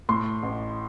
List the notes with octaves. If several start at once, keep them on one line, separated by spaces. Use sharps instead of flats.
A2 C6
A1